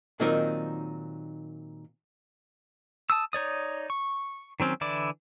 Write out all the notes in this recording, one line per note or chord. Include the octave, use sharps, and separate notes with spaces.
A#2 D#3 F#3 C4 D#4 A#4
A5 D#6 E6
D#4 C#5 D5 D#6
C#6
D#3 F#3 C4 C#4
D3 E3 E4 D5 D6